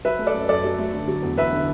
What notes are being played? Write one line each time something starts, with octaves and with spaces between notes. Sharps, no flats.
F#3 B4 E5
A3
A4 D5
F#2
F#2 A4 D5
F#3
A3
D3
F#3
E2
E2 B4 E5
D3